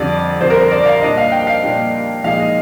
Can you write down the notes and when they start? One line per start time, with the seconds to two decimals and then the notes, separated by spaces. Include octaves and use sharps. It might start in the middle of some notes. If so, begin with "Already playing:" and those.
Already playing: F2 D3 G3 D5
0.41 F2 D3 G3 C5
0.50 A#4
0.56 C5
0.72 D5
0.86 F5
1.02 A#2 G3 D4 D#5
1.18 F5
1.32 G5
1.47 F5
1.63 A#2 G3 D4
2.24 A#2 F3 G#3 D#4 F5
2.40 D#5